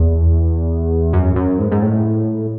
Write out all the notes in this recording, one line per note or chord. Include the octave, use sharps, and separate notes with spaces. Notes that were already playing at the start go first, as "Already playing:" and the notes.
Already playing: E2
F#2
F#2
G#2
G#2
A2